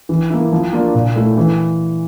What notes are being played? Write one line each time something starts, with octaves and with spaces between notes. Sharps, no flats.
E3
A#3 E4
F3
A#3 D4 F4
A#2
A3 E4
E3